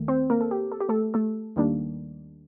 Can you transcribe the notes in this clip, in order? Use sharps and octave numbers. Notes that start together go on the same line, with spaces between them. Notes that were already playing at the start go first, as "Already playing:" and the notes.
Already playing: D#2 D#3 A3
C4 C5
A#3 A#4
A4
G4
A4
G4
A3 A4
A3 A4
D#2 D#3 G3 A#3 D4